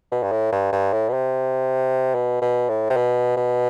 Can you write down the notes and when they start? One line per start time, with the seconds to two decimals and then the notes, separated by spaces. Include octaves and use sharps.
0.12 B2
0.23 G2
0.32 A2
0.52 G2
0.72 G2
0.93 A2
1.09 B2
1.13 C3
2.15 B2
2.42 B2
2.69 A2
2.90 C3
2.96 B2
3.37 B2